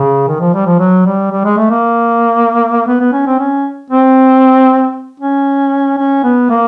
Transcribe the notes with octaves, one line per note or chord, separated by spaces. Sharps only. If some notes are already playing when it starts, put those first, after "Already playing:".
Already playing: C#3
D#3
F3
G3
F3
F#3
G3
G3
G#3
A3
A#3
B3
B3
C#4
C4
C#4
C4
C#4
C#4
B3
A#3